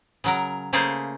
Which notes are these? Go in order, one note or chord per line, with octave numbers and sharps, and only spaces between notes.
C#3 F#3 A#4
C#3 A3 A#3 G#4 C5 F5